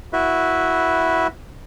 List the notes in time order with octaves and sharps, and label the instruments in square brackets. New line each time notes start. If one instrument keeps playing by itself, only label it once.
[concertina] E4 F#4 B4 E5